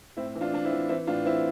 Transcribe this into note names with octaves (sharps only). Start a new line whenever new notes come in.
A2 C4 E4
E3
D4 F4
E3 D4
C4 E4
E3
E3 C4 E4
A2 D4 F4
E3 C4 E4